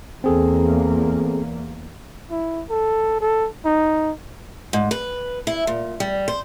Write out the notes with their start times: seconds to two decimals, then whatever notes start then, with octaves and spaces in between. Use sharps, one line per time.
0.24 E2 A#3 C4 G#4 A4
2.31 E4
2.69 A4
3.20 A4
3.65 D#4
4.73 G#2
4.91 B4
5.47 E4
5.67 A#2
6.00 G3
6.28 C5